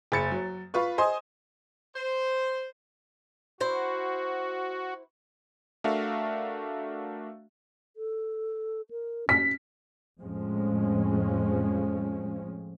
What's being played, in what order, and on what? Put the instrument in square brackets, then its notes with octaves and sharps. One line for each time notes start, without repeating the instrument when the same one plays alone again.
[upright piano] F#1 B5 A6 C#7
F#3
F4 B4 C#6
C5 D#5 G#5 C6 D#6
[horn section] C5
[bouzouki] E4 C5 [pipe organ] F#4
[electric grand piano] A3 D4 F#4 A#4 E5 F5
[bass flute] A4
A#4
[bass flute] C#4 [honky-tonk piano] B6
[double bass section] F2 A2 F3 G#3 C#4